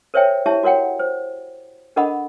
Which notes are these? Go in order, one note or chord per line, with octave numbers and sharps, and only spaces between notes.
A#4 C5 C#5 E5 G5 G#5
E4 G4 C#5 E5 A5
F#4 A#4 C#5 F#5 G5
C5
D4 A4 A#4 D#5 F#5 B5